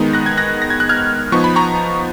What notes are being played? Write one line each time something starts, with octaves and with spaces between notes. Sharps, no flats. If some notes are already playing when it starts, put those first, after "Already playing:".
Already playing: D#3 G#3 B3 D#4
F#6 A#6
G#6
F#6 A#6
A#6
G#6
F#6
F6 G#6
F3 B3 D#4 C#6
B5
A#5 C#6